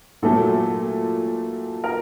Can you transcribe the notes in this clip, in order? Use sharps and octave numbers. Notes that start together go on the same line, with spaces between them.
A#2 F#3 A3 A4
A#4